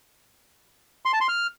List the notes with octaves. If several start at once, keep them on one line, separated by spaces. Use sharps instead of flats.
C6
A5
C6
F6